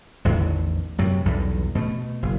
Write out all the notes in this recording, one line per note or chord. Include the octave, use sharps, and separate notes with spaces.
A1 E2 D3 D#3
F#2 C3 F#3
B1 E2 G2 G3
B2 A3
F#1